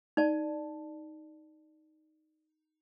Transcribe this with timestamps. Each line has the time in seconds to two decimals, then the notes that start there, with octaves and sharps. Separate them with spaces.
0.17 D#4 D5 A5